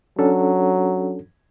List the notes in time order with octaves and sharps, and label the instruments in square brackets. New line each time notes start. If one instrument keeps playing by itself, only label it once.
[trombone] F#3 [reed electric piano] C#4 D4 A4